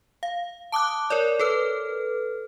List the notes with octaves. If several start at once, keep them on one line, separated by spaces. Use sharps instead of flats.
F5
A5 D6 D#6 F#6
A#4 C#5 D5
A4 B4 F6